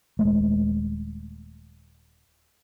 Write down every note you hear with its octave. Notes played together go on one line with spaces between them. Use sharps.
D#1 G#3 A3